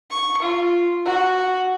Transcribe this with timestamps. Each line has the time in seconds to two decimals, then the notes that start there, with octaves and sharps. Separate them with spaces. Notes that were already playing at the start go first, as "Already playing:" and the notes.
0.10 C#6
0.42 F4
1.05 F#4